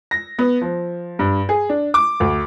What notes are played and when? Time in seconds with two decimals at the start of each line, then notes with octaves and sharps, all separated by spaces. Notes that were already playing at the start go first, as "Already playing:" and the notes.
0.11 A#6
0.39 B3
0.61 F3
1.19 G2
1.49 G#4
1.69 D4
1.94 D6
2.20 D2